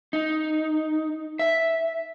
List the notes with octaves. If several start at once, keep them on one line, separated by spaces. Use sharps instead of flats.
D#4
E5